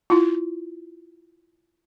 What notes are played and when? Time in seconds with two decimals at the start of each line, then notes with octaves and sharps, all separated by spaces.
0.10 E4 F4